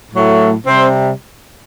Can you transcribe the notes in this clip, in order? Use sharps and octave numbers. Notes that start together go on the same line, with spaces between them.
A2 F#3 A3
C3 G3 C4